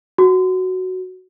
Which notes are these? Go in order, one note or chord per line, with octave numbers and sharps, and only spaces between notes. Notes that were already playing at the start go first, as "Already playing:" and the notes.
F#4